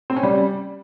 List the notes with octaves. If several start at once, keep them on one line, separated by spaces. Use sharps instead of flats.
C4
C#4
G3